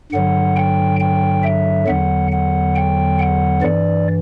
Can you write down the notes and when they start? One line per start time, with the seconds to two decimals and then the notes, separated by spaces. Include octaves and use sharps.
0.12 G2 D3 F#3 F#5
0.56 G5
1.00 G5
1.43 E5
1.87 E2 D3 F#3 F#5
2.32 F#5
2.75 G5
3.19 F#5
3.62 G2 E3 D5